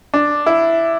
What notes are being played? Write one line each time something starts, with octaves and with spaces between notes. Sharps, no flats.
D4
E4